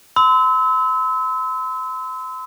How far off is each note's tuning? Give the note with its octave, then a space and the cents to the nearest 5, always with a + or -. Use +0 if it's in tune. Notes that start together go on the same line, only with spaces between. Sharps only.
C6 -40 E6 -30